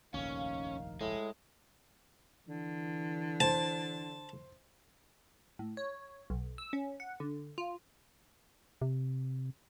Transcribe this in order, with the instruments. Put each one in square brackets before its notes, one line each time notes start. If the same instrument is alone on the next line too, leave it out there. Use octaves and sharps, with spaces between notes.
[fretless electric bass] F1 A#1 D#2 [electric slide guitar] C#4 [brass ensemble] D#4 A#4 F5
[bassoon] A2 [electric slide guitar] G#3
[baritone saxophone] D3 [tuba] E3
[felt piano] C5 [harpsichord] A5
[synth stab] A2
C#5
B1
E6
C#4
F#5
D3
F4
[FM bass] C3